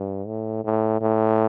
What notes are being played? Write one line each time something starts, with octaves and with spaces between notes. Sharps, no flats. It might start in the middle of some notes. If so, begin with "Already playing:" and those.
Already playing: G2
A2
A2
A2